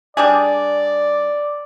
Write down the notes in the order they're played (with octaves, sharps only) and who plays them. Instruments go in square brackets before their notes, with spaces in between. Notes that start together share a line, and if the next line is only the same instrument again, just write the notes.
[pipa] G3 D4 G#4 [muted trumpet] D5